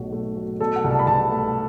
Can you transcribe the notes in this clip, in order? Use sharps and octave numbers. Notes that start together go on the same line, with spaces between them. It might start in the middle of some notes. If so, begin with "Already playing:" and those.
Already playing: B1 B2 A3 F#4
A3
F#3
B2 A4
F#5
C2
A5
B5
C2 A5
A3